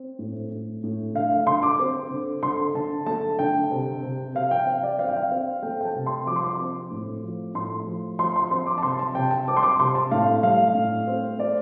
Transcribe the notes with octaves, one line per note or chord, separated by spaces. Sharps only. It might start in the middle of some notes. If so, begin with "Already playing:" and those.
Already playing: C4
A2
A2
A2
D3 F5
F5
D3 C6
D6
C4
D3
D3 C6
D3 A5
A3 A5
D3 G5
C3
C3
C3 F5
G5
C4 F5
D5
C4 F5
G5
F5
C4
A3 G5
G5
A5
C3
C6
F3 D6
C6
D6
C4
A2
F3
A2 C6
F3
F3 C6
C6
C4 C6
D6
A5
C3 C6
A5
C3 G5
A5
C4 D6
C6
D6
C3 C6
A5
A2 F5
G3 F5
A2
C4
C4 D5